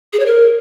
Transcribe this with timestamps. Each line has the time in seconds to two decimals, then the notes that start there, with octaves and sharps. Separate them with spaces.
0.13 G#4
0.20 C#5
0.26 A#4